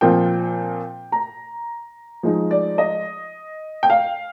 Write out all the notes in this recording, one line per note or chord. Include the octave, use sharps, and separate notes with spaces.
A#2 F3 C4 F4 G5
A#5
F3 G#3 D#4
D5
D#5
G5
F5